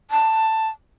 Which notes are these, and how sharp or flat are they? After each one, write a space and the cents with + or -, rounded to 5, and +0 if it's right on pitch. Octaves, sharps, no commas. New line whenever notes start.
A5 +10